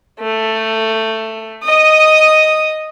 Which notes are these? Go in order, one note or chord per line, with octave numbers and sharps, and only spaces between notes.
A3
D#5 D#6